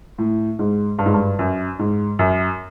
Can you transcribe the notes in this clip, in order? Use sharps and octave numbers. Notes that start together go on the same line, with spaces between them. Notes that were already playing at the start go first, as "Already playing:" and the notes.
A2
G#2
G2
G#2
G2
F#2
G#2
F#2